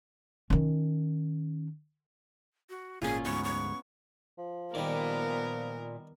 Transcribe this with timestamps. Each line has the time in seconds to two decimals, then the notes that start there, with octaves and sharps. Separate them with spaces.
0.50 D#3 C#4
2.70 F#4
3.02 G#1 A#2 C#4 F4 G#4
3.25 D2 G#2 B3 C#6
3.44 C#6
4.38 F3
4.75 A#2 D#3 G3 B3 A#4 D5